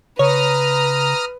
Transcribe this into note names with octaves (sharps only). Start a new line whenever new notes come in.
C#3 B4 C#5 A#5 D#6 F6